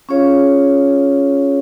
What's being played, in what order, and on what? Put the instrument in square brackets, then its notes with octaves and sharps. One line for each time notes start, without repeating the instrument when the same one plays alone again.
[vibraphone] C#4 F4 G#4 C#5 F5